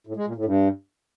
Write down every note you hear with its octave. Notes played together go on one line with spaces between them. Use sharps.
A2
G#3
A#2
A2
G2